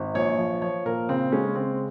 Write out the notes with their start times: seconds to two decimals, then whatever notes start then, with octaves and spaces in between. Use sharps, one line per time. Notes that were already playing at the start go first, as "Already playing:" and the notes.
Already playing: G#1
0.14 A#1 C#5
0.39 F3
0.62 F3 C#5
0.86 A#2 A#4
1.09 C#3 C4
1.32 G#3 C#4
1.55 C#3 C4